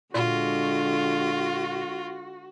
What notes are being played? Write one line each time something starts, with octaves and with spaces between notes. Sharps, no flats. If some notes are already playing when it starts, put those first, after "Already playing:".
A#2 D3 G#3 F4 F#4